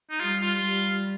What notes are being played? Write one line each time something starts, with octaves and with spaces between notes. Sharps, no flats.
D#4
G3 F4
F4
G3